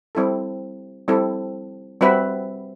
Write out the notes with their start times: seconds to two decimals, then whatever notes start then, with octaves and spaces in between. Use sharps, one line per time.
0.15 G3 C4 E4 A4
1.08 G3 C4 E4 A4
2.01 G3 C4 F#4 B4 E5